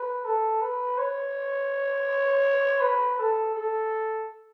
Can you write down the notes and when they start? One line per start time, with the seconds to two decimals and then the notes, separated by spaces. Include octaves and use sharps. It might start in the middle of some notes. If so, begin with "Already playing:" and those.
Already playing: B4
0.25 A4
0.61 B4
0.98 C#5
2.80 B4
3.18 A4
3.54 A4